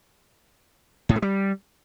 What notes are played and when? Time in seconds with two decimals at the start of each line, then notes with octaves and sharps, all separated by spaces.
1.09 A2
1.16 A3
1.22 G3